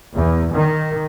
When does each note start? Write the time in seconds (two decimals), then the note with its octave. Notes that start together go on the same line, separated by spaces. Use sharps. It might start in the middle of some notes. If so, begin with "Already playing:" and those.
0.14 E2
0.53 D#3